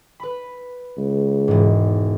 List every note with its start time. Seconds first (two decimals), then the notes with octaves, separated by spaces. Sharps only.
0.20 B4 B5
0.97 C#2
1.48 E1 G#2